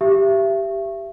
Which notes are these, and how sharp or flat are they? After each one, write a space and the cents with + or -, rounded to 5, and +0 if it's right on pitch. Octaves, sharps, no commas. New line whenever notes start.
G4 +0 E5 +30